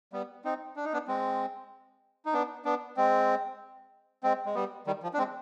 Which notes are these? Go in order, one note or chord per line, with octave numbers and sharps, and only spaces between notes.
G3 B3
C4 D#4
D4
D#4
B3 D4
G#3 C4
D#4
B3 D4
B3 D4
G#3 C4
G#3 C4
G#3
G3 B3
D#3 G3
F3
D4
G#3 C4